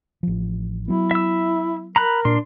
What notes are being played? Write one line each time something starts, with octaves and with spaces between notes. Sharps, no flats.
A1 F3
F#3 B3 E4
E5 E6
A#4 A#5 B5 F#6
A#2 D4 C6